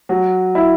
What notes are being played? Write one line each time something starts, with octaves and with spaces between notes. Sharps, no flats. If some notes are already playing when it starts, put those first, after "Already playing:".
F#3
E4